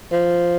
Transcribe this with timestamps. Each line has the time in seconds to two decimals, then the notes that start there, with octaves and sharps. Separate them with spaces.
0.12 F3